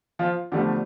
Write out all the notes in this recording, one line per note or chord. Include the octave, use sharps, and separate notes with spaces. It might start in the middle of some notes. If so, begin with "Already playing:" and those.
F3 F4
E2 D3 F3 G3 A3 G4